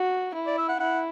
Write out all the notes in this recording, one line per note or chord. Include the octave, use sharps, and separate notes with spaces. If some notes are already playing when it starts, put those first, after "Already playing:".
Already playing: F#4
E4
D5
E5
F#5
E4 F#5